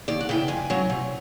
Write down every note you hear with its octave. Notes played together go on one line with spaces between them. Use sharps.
D#2 D5
F#5
C#3 E3 G5
F2 G#5
C#3 F#3
C3